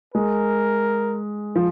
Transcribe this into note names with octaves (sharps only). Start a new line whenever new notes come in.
G#3 A#4
F3